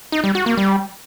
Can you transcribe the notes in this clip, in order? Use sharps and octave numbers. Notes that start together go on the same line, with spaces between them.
D#4
G3
F#4
A#3
G3